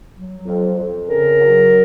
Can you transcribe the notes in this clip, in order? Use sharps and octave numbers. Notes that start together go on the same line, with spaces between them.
F#3
F2
F2
C#3 A#4
F#3